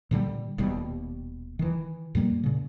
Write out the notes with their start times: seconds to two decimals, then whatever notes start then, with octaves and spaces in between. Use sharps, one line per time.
0.11 A#2 D3 D#3 G3
0.58 D#1 D#2 B2 G3
1.59 D#3 E3
2.15 F2 A#2 G3 A#3
2.44 A#2 C#3